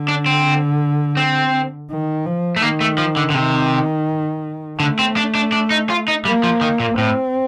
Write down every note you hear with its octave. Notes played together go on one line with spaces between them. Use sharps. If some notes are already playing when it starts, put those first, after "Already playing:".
Already playing: D3
D4
C4
C4
D#3
F3
A3
D#3 A#3
A3
F3
D3
D3
C3 D#3
D3 A3
C4
D4
D4
D4
D#4
F4
D#4
G3 A#3
F3
D#3
A#2
A2 C4